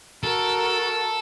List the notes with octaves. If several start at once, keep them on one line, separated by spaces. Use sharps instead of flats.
F#4 A4 A#4